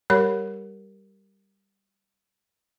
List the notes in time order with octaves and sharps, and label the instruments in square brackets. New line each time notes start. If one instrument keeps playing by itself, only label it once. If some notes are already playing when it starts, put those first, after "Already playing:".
[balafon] G3 G4 A#4 C#5 B5